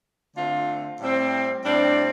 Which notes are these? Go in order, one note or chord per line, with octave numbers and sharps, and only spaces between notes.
D3 A3 C4 F4
A2 G3 C4
A2 G3 C4 D4